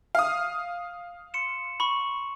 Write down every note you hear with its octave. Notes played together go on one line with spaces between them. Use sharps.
F5 D#6
C6 C#7 E7
B5 C#6